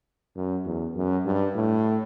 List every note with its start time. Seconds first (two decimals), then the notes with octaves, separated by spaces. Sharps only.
0.36 F#2
0.66 E2
0.96 F#2
1.26 G2
1.55 A2